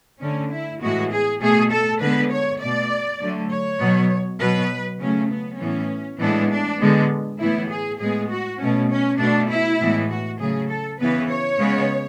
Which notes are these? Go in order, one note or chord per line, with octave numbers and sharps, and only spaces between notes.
D3 A3 C#4
E4
A2 E3 G#3 B3 F#4
G#4
B2 A3 G#4
A4
D3 G#3 B3 B4
C#5
B2 A3 D5
D3 F#3 A3
C#5
B2 F#3 B3
B2 F#3 B3 B4
C#3 F#3 A3 C#4
B3
A2 E3 B3 C#4
A2 E3 G#3 B3 D4
D4
D3 G#3 B3
A2 E3 B3 E4
G#4
A2 G#3 B3 G#4
F#4
B2 A3 C#4
C#4
B2 A3 D4
E4
A2 E3 G#3 B3
F#4
C#3 F#3 A3 G#4
A4
C#3 E3 B3 B4
C#5
C#3 G#3 B3